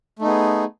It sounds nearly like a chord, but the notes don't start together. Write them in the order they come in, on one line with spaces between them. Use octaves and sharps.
A3 D#4 B3 G#4